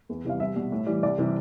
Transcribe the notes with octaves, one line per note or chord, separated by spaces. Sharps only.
E2
C3 E3 G3 F5
C2 E5
B2 G3
A2
E3 G3
C2 D5
C3 E3 G3